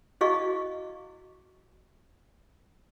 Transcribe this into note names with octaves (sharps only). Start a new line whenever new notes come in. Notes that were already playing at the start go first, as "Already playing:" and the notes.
E4 F#4 G#4 D#5 F5 C#6